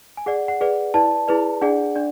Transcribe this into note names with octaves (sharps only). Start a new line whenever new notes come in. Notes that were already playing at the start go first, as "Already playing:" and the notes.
G#5
G#4 D5 F#5
F#5
G#4 B4 D5
E4 B4 D5 A5
E4 G#4 B4 D5
D4 G#4 D5 F#5
D4 D5